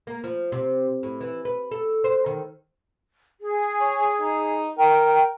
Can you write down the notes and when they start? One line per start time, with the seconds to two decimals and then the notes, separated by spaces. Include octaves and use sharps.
0.07 A#3
0.24 F3
0.52 C3
1.03 A2
1.21 E3
1.45 B4
1.71 A4
2.04 C5
2.26 D#3
3.40 G#4
3.81 C#5
4.20 D#4
4.78 A#4 G5